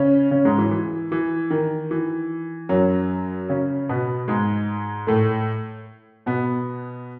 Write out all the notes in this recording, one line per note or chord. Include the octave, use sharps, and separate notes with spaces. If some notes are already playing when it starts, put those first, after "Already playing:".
Already playing: C#3 C#4
C#3 C#4
G#2 G#3
E3
E3
E3
D#3
E3
F#2 F#3
C#3 C#4
B2 B3
G#2 G#3
A2 A3
B2 B3